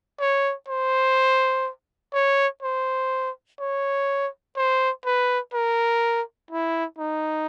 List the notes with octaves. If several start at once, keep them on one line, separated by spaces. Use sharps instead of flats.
C#5
C5
C#5
C5
C#5
C5
B4
A#4
E4
D#4